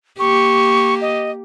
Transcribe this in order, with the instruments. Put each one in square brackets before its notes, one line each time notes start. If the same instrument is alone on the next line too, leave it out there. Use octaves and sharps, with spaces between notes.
[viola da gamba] A#3 G4 [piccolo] C#6
[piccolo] D#5